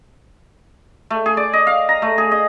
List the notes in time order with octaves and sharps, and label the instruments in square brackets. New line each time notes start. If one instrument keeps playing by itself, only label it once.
[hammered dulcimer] A3
G#4
D5
D#5
F5
A#5
A3
G#4
D#5